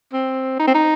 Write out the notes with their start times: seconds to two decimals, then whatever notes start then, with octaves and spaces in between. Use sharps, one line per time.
0.13 C4
0.59 D#4
0.67 C4
0.75 D#4